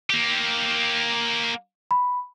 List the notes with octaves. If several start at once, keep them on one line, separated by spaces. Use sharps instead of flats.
A#3 G4
B5